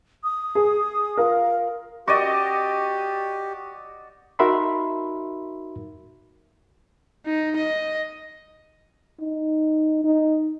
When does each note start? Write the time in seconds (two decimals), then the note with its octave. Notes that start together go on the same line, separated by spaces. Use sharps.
0.24 D#6
0.55 G#4
1.17 F4 A#4 F5
2.07 F#4 G4 D5 D#5
4.39 D#4 F#4 A#4 E5 B5 C6
7.26 D#4
7.57 D#5
9.21 D#4
10.04 D#4